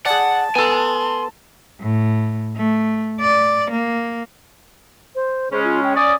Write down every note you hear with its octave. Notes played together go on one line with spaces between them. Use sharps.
G#4 D5 F#5 A5
B3 A4 G#5 C6
A2
A3
D5
A#3
C5
C#3 G#3 C#4 C5
F4
G5
C#4 D5 D#6